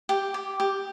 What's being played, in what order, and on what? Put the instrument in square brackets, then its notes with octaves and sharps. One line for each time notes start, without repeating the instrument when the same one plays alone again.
[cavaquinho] G4 G5
G4
G4